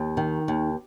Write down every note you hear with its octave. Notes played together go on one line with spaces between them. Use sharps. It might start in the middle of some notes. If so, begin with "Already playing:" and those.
Already playing: D#2
D#3
D#2